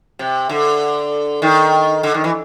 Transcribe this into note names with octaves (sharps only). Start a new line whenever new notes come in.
C3
D3
D#3
D3
D#3
E3